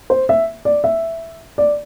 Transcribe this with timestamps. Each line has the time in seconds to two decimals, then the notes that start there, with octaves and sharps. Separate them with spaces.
0.10 C5
0.29 E5
0.65 D5
0.84 E5
1.58 D5